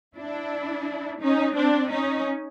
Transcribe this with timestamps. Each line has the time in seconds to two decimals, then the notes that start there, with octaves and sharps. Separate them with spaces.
0.16 D4 E4
1.20 C#4 D#4
1.55 C4 D4
1.90 C#4 D#4